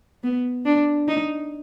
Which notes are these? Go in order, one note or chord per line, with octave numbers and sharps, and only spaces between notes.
B3
D4
D#4